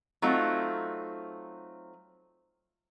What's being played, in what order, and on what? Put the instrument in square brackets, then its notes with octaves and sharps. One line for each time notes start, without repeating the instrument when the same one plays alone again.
[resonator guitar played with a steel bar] F#3 A3 C4 D#4 F4